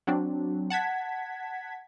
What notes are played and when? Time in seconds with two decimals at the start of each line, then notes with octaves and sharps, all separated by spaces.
0.07 F#3 C4 D4
0.70 F#5 A5 G#6 B6